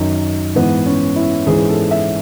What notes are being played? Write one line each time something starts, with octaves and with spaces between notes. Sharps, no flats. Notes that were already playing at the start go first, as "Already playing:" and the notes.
Already playing: F#2 D#3 D#4
G#2 E3 B3
C#4
E4
G#2 E3 G#4
A4
E5